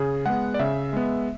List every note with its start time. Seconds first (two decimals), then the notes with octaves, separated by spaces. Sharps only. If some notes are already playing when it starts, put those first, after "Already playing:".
Already playing: C#3 G#4
0.26 G#3 B3 F#5
0.54 D5
0.59 C#3 E5
0.93 G#3 B3